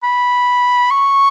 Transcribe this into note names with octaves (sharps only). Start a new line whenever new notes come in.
B5
C#6